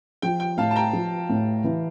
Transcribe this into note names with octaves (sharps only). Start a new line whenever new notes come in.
F3 G5
G5
A2 F5 A5
A5
G5 A#5
F3
A2
E3